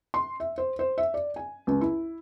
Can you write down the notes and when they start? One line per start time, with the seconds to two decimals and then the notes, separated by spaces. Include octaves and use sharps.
0.14 C6
0.40 E5
0.58 C5
0.79 C5
0.98 E5
1.14 D5
1.36 G#5
1.67 C#2
1.81 E4